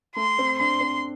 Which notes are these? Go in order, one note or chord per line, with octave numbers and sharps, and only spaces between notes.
A3 C6
C4
D4 C6
C4